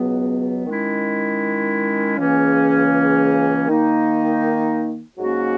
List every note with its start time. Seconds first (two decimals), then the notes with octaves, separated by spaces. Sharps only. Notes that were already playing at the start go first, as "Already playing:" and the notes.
Already playing: C#2 B2 F#3 B3
0.66 D#3 G#3 C#4 E4
2.16 C#2 C#3 E3 A#3 C#4
3.68 D#3 A#3 D#4
5.18 G#2 F#3 A#3 C#4 F#4